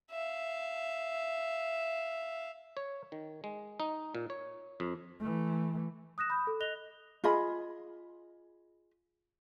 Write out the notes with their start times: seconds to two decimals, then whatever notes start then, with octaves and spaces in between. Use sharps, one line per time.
0.11 E5 F5
2.77 C#5
3.12 D#3
3.44 G#3
3.80 D#4
4.15 A#2
4.30 C#5
4.80 F2
5.20 E3 A3
6.18 D#6 F#6 A#6 E7
6.30 B5 D#6 G6
6.47 A4
6.60 D#5 F#6 A#6 F7 G7
7.24 F4 G#4 D#5 B5